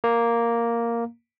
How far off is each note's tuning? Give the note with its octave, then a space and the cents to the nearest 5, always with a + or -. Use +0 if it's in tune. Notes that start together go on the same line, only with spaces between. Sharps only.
A#3 +0 A#5 +0